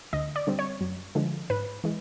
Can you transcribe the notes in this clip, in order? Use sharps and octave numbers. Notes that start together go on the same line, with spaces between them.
D2 D#5
D5
D3 G3 C4
C#5
F#2
D3 F3 G#3
G#2 B4
E3 G#3